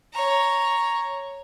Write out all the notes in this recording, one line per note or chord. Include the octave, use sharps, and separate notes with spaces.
C#5 A#5